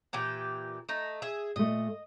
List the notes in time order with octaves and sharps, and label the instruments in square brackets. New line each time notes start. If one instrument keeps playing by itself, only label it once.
[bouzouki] A#2 E3 G4
A3 D#4
G#4 E5
[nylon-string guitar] A#2 A3 [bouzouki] D#5